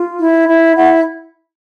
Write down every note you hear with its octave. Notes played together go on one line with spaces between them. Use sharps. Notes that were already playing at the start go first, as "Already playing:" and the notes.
Already playing: F4
E4
E4
E4 F#5